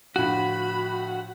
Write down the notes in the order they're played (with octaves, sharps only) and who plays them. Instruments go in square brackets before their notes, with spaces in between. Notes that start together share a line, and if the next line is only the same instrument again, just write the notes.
[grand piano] A2 D3 F3 [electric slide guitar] F#4 [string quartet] B5